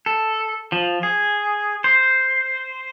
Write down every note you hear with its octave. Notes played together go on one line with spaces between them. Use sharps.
A4
F3
G#4
C5